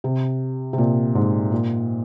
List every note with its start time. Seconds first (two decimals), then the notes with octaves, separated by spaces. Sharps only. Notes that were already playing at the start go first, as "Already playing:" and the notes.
0.04 C3
0.73 C3
0.78 A#2
1.15 G#2
1.52 A#2